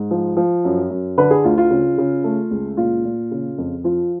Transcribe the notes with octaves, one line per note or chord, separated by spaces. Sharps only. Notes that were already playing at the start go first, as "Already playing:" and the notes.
Already playing: G#2
F3
F3
F#2
F#2
D3 B4
G#4
D2 F4
F4
C#3
C#3
A3
C#2
A#2 F4
A#2
C#3
F2
F3 F4